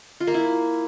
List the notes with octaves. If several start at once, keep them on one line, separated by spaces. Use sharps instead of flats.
F4
A#3
E4